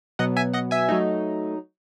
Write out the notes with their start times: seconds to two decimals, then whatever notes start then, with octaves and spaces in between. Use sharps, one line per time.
0.19 B2 F#3 B3 D#5 F#5
0.36 E5 G#5
0.53 D#5 F#5
0.71 E5 G#5
0.89 F#3 A3 D#4